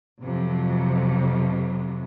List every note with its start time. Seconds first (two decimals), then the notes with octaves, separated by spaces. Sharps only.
0.21 F2 C3 F#3